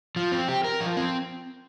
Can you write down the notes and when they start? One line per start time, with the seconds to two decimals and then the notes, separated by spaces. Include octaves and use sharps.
0.16 F3
0.32 C4
0.48 G4
0.64 A#4
0.80 F3
0.97 C4